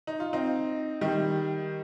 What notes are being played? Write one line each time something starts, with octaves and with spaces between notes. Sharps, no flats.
D#4
F4
C4 D#4
D#3 G3